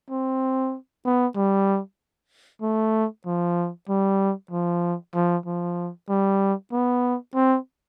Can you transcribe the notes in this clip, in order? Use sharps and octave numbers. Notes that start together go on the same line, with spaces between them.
C4
B3
G3
A3
F3
G3
F3
F3
F3
G3
B3
C4